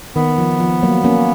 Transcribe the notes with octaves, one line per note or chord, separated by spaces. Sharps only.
D#3 B3
F3
F3
F#3 A#3
A#3 C#4